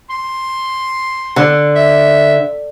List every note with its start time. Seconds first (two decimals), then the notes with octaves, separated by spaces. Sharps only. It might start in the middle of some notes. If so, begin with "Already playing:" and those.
0.10 C6
1.36 D3
1.75 E5